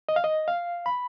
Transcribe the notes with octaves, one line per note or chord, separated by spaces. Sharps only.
D#5
F5
D#5
F5
B5